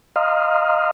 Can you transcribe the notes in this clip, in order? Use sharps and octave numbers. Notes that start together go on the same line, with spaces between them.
D#5 F5 A#5 C6 D#6 F6